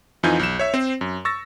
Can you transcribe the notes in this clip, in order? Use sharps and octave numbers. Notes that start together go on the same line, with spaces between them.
F2 E3 D#4 F4 G#5 G6
B1 E7
C#5 E5
C4 C5
F#2
C#6 E6 A6 A#6